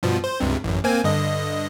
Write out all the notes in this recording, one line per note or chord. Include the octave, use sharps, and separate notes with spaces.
G2 B2 F3
C5
C#2 G2 C3
A1 F#2
A#3 C4 G#5
G2 D3 D#5